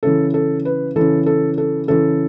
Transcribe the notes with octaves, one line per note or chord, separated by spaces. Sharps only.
C#3 E3 A4
A4
B4
C#3 E3 A4
A4
A4
C#3 E3 A4